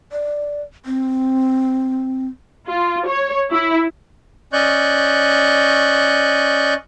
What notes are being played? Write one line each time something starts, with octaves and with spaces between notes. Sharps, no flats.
D5
C4
F4
C#5
E4
C#4 D5 D#5 C#6 F#6 G6